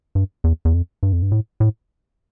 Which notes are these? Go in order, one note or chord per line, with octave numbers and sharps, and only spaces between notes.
G2
E2
E2
F2
G2
F2
G2
A2
A2